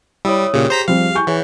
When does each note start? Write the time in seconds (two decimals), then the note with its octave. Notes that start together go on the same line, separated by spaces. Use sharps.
0.25 G3 E4 C#5 D#6 E6
0.54 A#2 C#3 G4 G#4
0.70 C5 A#5 B6
0.88 F3 G3 C4 F5
1.15 G#5 C#6 G6
1.27 E3 G#4 C#5 F#5